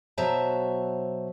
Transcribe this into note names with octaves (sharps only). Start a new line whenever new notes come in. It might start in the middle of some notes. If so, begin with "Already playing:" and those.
B2 F#3 C5 E5 A5 A#5